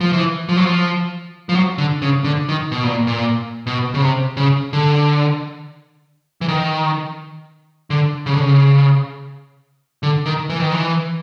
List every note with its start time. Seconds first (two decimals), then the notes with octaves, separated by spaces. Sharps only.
0.01 F3
0.13 E3
0.49 F3
0.57 F#3
0.65 F3
1.49 F3
1.55 F#3
1.78 D3
2.02 C#3
2.24 D3
2.49 D#3
2.72 B2
2.84 A#2
3.07 A#2
3.67 B2
3.94 C#3
4.02 C3
4.37 C#3
4.73 D3
6.41 E3
6.48 D#3
7.90 D3
8.26 C#3
8.33 D3
8.40 C#3
10.03 D3
10.26 D#3
10.49 E3
10.61 D#3
10.72 E3